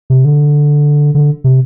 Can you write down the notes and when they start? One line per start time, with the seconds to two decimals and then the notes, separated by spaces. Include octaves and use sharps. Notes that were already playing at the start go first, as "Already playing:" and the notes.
0.10 C3
0.25 D3
1.15 D3
1.44 C3